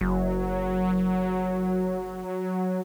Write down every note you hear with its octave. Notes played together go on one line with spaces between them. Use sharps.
F#1 F#3